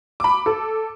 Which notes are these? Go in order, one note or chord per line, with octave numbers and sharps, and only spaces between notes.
B5 D6
A4